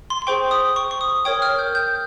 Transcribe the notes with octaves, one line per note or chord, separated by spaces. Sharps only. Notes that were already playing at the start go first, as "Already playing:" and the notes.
C6
C6
G#4 C5 G5 C#6
D#6
C#6
C#6
D#6
A#4 C#5 G5 D#6
F6
G6
G6